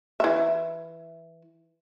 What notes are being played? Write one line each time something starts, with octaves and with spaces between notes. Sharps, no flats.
E3 E5